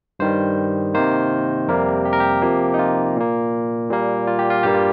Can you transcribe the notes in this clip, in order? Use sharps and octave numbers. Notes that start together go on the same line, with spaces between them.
G2 D#3 G3 C5
C3 D#3 A#3 C5
F2 C3 G3 A#3 A#4
G4
A#4
G4
C3 F3 A#3
D#4
F4
A#2 A#3
A#2 G3 A#3
F4
G4
F4
G2 G3 A#3 G4
F4